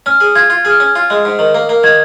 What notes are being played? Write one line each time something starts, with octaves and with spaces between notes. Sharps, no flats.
C#4 F6
G#4
F4 G#6
F4
G#4 F6
C#4
F4
G#3
G#2
D#3
A#3
A#3
D#3 G#6